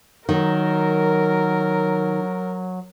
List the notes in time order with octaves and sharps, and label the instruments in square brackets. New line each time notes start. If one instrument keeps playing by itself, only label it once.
[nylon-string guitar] D#3 [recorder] F#3 [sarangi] A#4